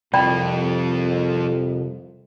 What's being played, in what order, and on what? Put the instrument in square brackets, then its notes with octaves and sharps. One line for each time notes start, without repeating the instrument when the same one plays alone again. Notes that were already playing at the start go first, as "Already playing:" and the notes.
[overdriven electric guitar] C2 [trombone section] F2 [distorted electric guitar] F3 A4 [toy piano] D5 G5 B5